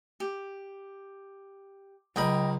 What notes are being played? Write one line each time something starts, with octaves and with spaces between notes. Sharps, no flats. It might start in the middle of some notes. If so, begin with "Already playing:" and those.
G4
C#2 F#3 A#4 D#5 G5 B5